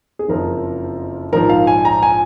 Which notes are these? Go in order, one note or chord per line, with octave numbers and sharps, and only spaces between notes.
G#4
F#1 F2 F3 A#4
A#1 G#2 F3 A#4
F5
G#5
A#5
G#5